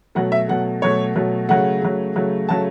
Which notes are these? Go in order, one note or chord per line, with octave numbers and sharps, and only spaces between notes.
B2 F#3 A3 F#5
E5
B2 F#3 A3 F#5
B2 F#3 A3 C#5
B2 F#3 A3
C#3 F#3 A3 F#5
C#3 F#3 A3
C#3 F#3 A3
C#3 F#3 A3 A5